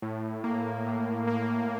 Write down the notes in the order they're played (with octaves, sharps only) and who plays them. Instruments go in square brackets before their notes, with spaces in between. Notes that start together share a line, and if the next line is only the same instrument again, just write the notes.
[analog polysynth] A2
A#3
A2
A#3